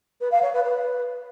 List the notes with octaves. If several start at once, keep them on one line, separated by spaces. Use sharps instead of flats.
B4
F5
C#5
B4
B4